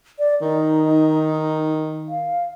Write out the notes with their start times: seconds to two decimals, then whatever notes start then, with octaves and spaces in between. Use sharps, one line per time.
0.19 D5
0.41 D#3 D#4
2.08 F5